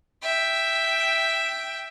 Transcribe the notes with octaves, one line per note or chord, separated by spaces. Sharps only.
E5 G5